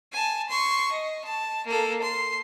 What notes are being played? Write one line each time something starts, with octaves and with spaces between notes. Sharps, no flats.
G#5 A5
C6 C#6
D#5
A5
A#3 A4
C6